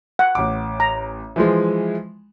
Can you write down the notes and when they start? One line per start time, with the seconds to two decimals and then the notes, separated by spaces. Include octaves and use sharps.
0.19 F#5
0.35 A1 D6
0.80 A#5
1.36 E3 F3 G#3